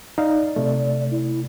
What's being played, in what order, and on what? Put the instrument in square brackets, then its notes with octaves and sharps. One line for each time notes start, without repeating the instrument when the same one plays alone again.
[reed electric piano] D#4 F5 [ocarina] D5
[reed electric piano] C3 A3
[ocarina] E4